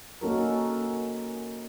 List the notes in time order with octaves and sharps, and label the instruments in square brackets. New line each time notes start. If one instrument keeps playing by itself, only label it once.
[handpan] A#3 C#4 D#4 F#4 A4 A#4